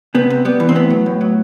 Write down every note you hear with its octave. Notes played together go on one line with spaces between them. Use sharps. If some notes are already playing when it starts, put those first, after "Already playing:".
C3 B3
C3
G3 B3
E3
C4
A2 B3
F#3
A2
F#3